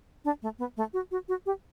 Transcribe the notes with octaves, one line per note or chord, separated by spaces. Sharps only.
D4
A3
B3
A3
F#4
F#4
F#4
G4